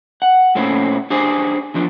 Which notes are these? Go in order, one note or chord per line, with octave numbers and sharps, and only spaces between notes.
F#5
A#2 A3 C4 C#4 E4
D4 G4 G#4 C5 D5
E2 F3 D4